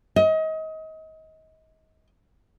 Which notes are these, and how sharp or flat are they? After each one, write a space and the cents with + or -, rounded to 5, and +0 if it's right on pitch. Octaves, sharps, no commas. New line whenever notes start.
D#5 +30